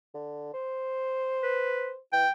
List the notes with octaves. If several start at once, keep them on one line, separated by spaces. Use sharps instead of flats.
D3
C5
B4
E3 G5